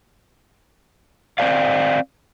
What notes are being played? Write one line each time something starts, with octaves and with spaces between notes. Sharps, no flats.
C4 C5 D5 F5